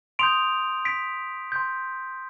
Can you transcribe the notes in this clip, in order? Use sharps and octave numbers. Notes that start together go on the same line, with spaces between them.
C6 D#6 G6 D7 F7
B6 D7
C6 G6